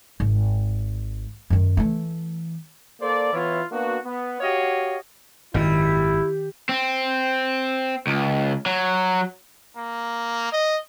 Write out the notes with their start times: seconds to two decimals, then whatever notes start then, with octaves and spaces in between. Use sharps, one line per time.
0.20 G#1
1.50 F#2 D#3
1.77 E3 A3
3.01 A#3 A4 C5 D5
3.33 E3 B3 E4 F4 C#5
3.71 A#3 B3 D4 F#4
4.04 B3
4.41 F#4 G4 C#5 D#5 F5
5.54 G#1 F#2 A#2 D#3 G3 E4
6.69 C4
8.07 C#2
8.66 F#3
9.77 A#3
10.52 D#5